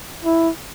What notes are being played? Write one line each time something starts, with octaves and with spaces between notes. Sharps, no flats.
E4